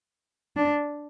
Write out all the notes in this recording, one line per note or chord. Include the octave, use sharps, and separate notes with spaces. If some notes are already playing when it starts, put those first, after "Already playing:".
D4